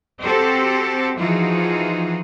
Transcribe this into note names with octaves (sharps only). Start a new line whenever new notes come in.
C4 F#4 G4 A4 C5
E3 F3 D#4 F4 F#4 G#4